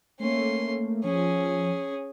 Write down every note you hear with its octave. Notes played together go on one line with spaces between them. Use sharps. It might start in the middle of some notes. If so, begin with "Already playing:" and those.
A3 A#3 C#4 C6
F3 C#4 G#4